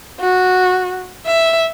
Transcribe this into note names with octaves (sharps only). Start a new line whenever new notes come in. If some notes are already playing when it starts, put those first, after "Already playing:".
F#4
E5